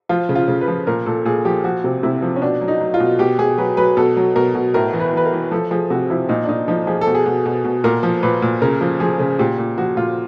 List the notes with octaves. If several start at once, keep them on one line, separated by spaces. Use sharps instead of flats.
F3 F4
C#3
F4
C#3
B4
F3
A#2 A#4
A#2 A4
A#2 G#4
F3 G4
F3 F#4
C3
C3 E4
F3
C#4
B2 D4
F#3
D#4
F#3
F4
B2
B2 G4
B2 G#4
F#3 B4
F#3 B4
B2 A4
F#3
B2 A#4
B2
A2 A#4
E3
B4
E3 B4
A#4
E3
F3 A4
F3 G#4
C3 F#4
F3 E4
A#2 D#4
D4
A#2 D#4
F3 D#4
F3 G#4
A4
B2
G#4
B2
B2
B2
A#2 A#4
F3
A#2 B4
A#2
C#3 A#4
F3
F3 G#4
C#3
A#2 G4
A#2
F3 F#4
A#2 F4